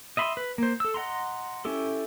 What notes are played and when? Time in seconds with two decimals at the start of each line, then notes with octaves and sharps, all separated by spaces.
0.17 D#5 E5 B5 C6
0.37 B4
0.58 A#3 C5
0.80 A4 E6
0.94 D#5 F#5 A#5 C6
1.65 C#4 E4 G4 A4